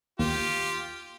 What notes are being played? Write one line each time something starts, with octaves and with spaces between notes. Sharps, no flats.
D#2 F4 G4